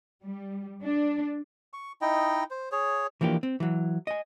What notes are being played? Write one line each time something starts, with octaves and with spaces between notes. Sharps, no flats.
G3
D4
C#6
D#4 E4 D#5 G5
C5
G#4 C#5
E3 F3 A#3 D4 G4
C4
E3 F#3
D#5 G#5